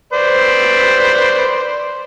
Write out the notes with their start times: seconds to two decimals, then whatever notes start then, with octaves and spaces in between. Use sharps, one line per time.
0.13 B4 C5 D5